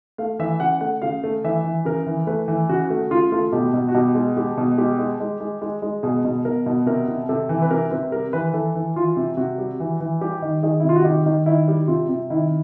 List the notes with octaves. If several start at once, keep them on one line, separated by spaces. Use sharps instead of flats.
A3 F5
E3 E5
C#3 F#5
A3 F#5
C#3 F5
A3
E3 E5
E3
C#3 A#4
E3
A3 B4
E3
C#3 F#4
A3 F#4
C#3 F4
A3 F4
B2 G4
B2
F#4
B2 G4
G#3
G#3 G4
B2
G#3 G4
G#3
G#3
G#3
G#3
G#3
B2 G#4
B2
B2 A#4
B2
C3 A#4
C3
C3 A4
E3
B4
C3 A#4
C3 B4
G3 A#4
E3 B4
E3 A4
E3
E3 F4
C3
C3 F#4
G3
E3
E3
G3 G4
D#3
D#3 G#4
E4
C3
F4
F#4
D#3 G4
D#3
D#3 E4
G3
C3 F4
C3
D#3 E4